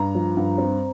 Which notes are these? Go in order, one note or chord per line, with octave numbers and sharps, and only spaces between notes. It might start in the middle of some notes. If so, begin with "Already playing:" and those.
Already playing: G2 A#5
F3
G2
C4